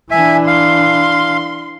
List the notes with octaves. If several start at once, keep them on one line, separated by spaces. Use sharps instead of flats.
E3 D4 E5 G#5
F5 C6